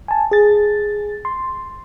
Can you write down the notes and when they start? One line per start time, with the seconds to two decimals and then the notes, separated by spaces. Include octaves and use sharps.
0.08 G#5 A5
0.31 G#4 A6
1.25 C6